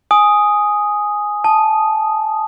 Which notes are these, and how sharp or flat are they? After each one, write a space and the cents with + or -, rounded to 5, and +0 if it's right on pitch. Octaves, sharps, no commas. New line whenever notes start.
G#5 +0 D#6 +0
A5 -15 D#6 -5